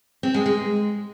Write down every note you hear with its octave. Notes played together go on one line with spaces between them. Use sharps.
C4
G#3
G#3